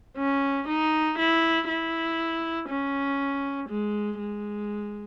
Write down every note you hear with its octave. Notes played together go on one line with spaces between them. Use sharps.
C#4
D#4
E4
E4
C#4
G#3
G#3